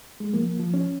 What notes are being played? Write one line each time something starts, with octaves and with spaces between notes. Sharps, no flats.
G#3
F3 A#3
F3
C#4